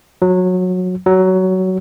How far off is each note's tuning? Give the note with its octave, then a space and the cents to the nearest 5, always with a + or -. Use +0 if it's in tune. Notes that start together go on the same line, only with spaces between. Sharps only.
F#3 -20
F#3 +15